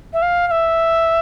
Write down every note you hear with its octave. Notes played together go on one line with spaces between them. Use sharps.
E5
F5
F5
E5